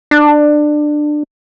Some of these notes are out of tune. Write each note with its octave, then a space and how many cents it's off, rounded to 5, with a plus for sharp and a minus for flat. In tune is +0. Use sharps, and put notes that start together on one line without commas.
D4 +20